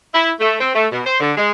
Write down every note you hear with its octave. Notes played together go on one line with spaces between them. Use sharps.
E4
A3
C4
A3
B2
C5
D3
G#3